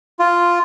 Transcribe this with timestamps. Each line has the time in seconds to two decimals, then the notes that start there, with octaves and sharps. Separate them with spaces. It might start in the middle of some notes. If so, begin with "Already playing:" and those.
0.19 F4